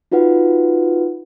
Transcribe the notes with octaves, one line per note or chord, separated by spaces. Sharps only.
D#4 F4 F#4 B4 F#5